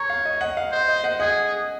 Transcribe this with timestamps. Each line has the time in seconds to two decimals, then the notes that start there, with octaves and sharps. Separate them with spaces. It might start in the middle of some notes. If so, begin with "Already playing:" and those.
Already playing: C#5 A#5 C#6
0.10 F5
0.25 D#5
0.41 D#5 F#5
0.57 F5
0.72 C5 D#5
0.88 D#5
1.04 D#5 F#5
1.20 G#4 D#5 F#5